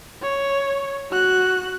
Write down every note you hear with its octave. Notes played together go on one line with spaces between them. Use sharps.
C#5
F#4 F#6